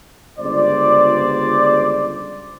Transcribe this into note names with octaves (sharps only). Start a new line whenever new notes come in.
G1 C#2 C5 D5